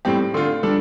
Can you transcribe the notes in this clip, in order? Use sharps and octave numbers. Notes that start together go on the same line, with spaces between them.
A2 G3 C4 G4
D3 A3 F4
G3 D4 A4